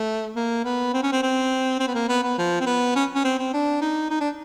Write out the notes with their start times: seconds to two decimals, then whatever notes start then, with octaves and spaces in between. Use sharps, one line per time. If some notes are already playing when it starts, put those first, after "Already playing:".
Already playing: A3
0.36 A#3
0.65 B3
0.94 C4
1.03 C#4
1.12 C4
1.23 C4
1.80 C4
1.88 B3
1.95 A#3
2.09 B3
2.24 B3
2.38 F3
2.61 C4
2.66 B3
2.96 C#4
3.15 C#4
3.25 C4
3.39 C4
3.54 D4
3.81 D#4
4.11 D#4
4.21 D4